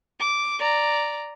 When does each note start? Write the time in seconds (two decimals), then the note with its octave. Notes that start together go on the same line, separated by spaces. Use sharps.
0.20 D6
0.59 D5 A#5